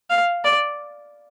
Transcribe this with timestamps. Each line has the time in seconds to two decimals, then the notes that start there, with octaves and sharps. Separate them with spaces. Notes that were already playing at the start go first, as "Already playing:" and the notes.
0.10 F5
0.44 D5